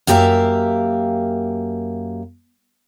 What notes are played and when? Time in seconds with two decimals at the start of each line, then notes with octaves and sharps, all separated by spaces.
0.07 F#2 A#3 G4 A#4 E5 F5